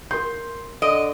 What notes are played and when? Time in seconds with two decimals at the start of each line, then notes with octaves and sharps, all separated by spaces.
0.11 A#4 C6 G6
0.82 D3 D#5 D7